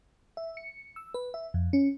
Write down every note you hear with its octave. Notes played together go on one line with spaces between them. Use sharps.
E5
C#7
E6
B4
E5
F2
C#4